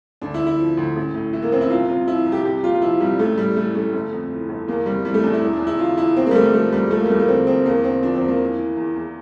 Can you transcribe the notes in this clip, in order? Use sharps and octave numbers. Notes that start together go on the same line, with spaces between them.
D2 D4
E4
D3
E4
F3
D2
A1
A2
E3 E4
A#3
A1 C4
E4
C2 F4
C3 F4
F3 E4
C2
G4
C2 G4
A#2 F4
F4
F3 E4
C2 G3
A1 A3
A2 G3
E3 A3
A1 A3
G1
F2
E3
G1
E2 A#3
C3 G3
E3 G3
A3
E2 D4
E4
E1
D4
E2
E4
D3 F4
E1 E4
E2 C4
G3 A#3
D3 A3
G3
F3 A3
E2 G3
F3 A3
A#3
G3
E2 A3
A#3
D3 C4
E1 C4
E2 A#3
D3 C4
F3 D4
C4
E2
A#3
E3
E3
E2
E2